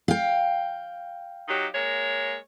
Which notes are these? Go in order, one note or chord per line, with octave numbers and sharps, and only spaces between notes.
F5 G5
F#3 D#4 G4
G#3 A#3 C#5